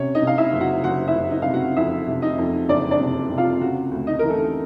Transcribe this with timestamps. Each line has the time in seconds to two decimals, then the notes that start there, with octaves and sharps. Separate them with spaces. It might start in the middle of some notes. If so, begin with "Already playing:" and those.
Already playing: C3 C#4 C#5
0.15 D#4 D#5
0.22 C3
0.27 F5
0.38 E4 E5
0.53 F#1
0.61 F#4 F#5
0.84 F#1 F#4 F#5
1.07 E4 E5
1.15 F#1
1.30 D#4 D#5
1.42 C3 F5
1.53 F#4 F#5
1.77 F2 E4 E5
2.07 C3
2.22 D#4 D#5
2.38 F2
2.69 F#1 D4 D5
2.91 D4 D5
3.00 C3
3.30 C3
3.37 F4 F5
3.61 C#3 F#4 F#5
3.91 D2
4.07 D#4 D#5
4.19 E3 A#4
4.30 A3 A4